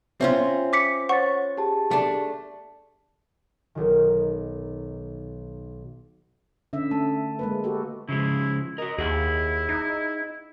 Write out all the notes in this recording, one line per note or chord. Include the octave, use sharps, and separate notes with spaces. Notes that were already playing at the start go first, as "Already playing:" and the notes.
C4 C#4 F4 E5
D6 B6 C#7
C5 C#5 F#5 C#6 A6
G4 G#4 A5
A3 D4
B1 D#3
D3 C#4 E5
A3 A5
G#3 A#3 B4
F#4 G4 A4
C#3 F3 G#3 E4
F#4 A#4 D#5
D#2 E4 G#4 F#5
D#4